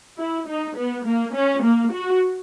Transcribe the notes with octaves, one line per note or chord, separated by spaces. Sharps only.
E4
D#4
B3
A#3
C#4
A#3
F#4